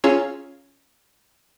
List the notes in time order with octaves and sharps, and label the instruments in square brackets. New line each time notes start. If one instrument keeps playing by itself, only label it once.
[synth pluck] C#4 F4 G#4 C#5 A#5 E6